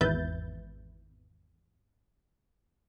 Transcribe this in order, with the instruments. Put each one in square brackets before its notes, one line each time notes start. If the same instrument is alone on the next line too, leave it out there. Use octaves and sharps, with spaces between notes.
[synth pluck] G#1 E2 B4 E5 G6 A6